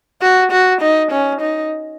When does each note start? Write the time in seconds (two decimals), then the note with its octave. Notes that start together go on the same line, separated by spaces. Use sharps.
0.22 F#4
0.51 F#4
0.81 D#4
1.12 C#4
1.41 D#4